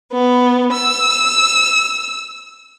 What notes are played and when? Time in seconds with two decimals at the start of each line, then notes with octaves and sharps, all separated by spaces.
0.12 B3
0.72 E6